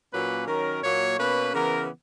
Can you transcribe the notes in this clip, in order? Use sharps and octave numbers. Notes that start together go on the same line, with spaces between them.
A#2 F#3 A#3 C#4 B4
D#3 F#3 C#4 A#4
A#2 F#3 A#3 C#5
B2 A#3 C#4 B4
C#3 E3 B3 A#4